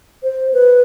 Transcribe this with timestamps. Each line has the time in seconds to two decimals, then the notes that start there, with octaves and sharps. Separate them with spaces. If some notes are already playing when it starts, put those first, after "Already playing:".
0.23 C5
0.53 B4